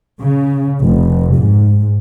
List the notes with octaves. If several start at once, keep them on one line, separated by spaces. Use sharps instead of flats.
C#3
F1
G#2